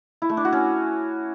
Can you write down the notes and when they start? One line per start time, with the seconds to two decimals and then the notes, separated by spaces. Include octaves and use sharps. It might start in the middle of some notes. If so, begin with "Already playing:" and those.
0.22 E4
0.29 A3
0.37 D4
0.45 F#4
0.52 C#4